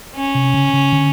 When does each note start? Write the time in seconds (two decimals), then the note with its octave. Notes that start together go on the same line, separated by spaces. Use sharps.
0.16 C#4
0.35 C3
0.54 C#3
0.73 C#3
0.93 D3